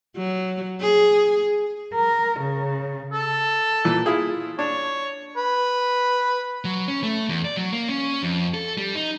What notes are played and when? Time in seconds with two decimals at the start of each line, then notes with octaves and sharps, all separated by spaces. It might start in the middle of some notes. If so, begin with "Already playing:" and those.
0.16 F#3
0.81 G#4
1.95 A#4
2.40 C#3
3.12 A4
3.85 A#2 E3
4.06 E4 F4 G#4
4.59 D4 C#5
5.37 B4
6.65 F#3
6.88 C#4
7.03 A3
7.29 E2
7.45 D5
7.57 F#3
7.72 A#3
7.88 C#4
8.23 F2
8.54 A4
8.78 G3
8.95 D#4